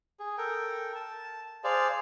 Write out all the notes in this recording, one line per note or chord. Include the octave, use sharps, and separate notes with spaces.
G#4
A4 A#4 G5
A5
G#4 C5 D5 F5